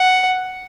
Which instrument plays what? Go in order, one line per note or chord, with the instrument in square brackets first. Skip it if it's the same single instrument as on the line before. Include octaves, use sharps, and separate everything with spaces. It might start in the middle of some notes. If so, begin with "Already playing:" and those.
Already playing: [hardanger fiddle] F#5